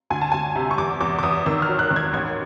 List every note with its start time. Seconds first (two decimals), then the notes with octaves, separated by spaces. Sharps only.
0.10 D2 G#5
0.21 A5
0.32 D2 G#5
0.56 C3
0.71 C#6
0.78 E2 D6
1.01 E2 D6
1.19 D6
1.23 E2 D#6
1.46 D#3 E6
1.62 F6
1.68 F#3
1.79 F#6
1.91 D#3
1.96 G#6
2.13 A1 G#6